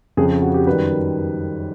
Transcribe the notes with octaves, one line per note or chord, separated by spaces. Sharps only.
F2 C#3 F3 G#4
F#4
G4
F#2 D#3 G3 B4